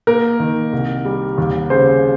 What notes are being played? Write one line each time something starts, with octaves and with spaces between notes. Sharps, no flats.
A#3 A#4
D#3
C2
G3
D#2
C#3 C5